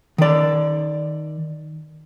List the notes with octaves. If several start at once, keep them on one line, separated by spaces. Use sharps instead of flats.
D#3 D5